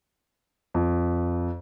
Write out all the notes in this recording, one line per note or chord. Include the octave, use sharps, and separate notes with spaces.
F2